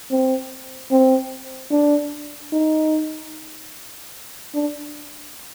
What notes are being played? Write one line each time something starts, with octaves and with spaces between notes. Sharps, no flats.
C4
C4
D4
D#4
D4